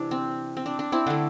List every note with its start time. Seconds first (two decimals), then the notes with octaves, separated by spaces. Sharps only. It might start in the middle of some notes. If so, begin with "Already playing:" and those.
Already playing: C3 E3 D4
0.11 C4
0.57 C4
0.66 D4
0.79 D4
0.92 C4 E4
1.06 D3 A3 D4